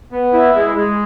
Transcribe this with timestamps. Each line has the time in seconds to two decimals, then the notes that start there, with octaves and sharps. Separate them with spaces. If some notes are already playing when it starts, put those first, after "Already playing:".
0.12 B3
0.33 E4
0.55 G#3
0.77 G#3